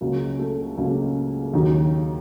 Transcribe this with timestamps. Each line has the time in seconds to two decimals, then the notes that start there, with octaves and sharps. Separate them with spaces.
0.01 C#2 C#3 F#3 A#3
0.39 A3
0.77 C#2 C#3 F#3 A#3
1.53 D#2 D#3 F#3